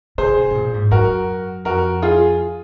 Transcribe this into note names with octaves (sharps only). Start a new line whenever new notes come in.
C#3 G#4 C5
C#3
C3
C3
A#2
G#2
F#2 F#4 A#4
F2 F#4 A#4
F4 G#4